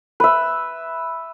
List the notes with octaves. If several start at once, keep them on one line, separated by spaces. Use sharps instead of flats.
B4 E5